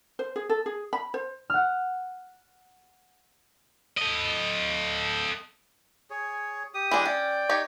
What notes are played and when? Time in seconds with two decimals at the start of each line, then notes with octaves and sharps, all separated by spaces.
0.19 C5
0.36 G#4
0.50 A4
0.66 G#4
0.93 B5
1.14 C5
1.50 F#5 F6
3.97 A4 D#5
6.10 G#4 C#5
6.74 G4 D#6
6.91 E3 G#3 D4
7.05 C#4 D5 G5
7.49 D#4 G4 C#5